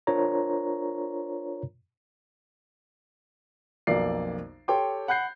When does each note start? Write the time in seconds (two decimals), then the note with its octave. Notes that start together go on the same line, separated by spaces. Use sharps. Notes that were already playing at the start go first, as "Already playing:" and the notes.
0.07 D4 F4 A#4 C5 C#5 A#5
3.87 B1 F2 A#3 D5 C7
4.68 G4 A4 C#5 G5 C6 D6
5.08 F#5 B5 F#6 G6 C7